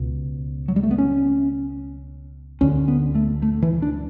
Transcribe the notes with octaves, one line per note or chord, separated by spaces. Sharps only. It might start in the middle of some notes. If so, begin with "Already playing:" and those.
Already playing: C#2 B2
F#3
G3
A3
B3
C#4
D2 D3 C#4
B3
A3
A3
E3
D4